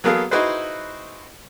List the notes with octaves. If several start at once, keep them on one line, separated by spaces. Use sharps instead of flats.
F#3 A#3 B3 G#4 A4 F5
D#4 E4 F#4 G#4 B4 C5